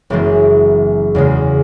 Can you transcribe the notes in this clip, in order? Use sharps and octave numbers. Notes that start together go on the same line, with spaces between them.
F#1 F#2 E3 G#3 B3
E2 C#3 G#3